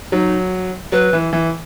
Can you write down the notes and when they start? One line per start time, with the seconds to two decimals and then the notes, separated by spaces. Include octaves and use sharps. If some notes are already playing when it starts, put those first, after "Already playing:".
0.12 F#3 D#4
0.92 F#3 B4
1.13 E3
1.33 E3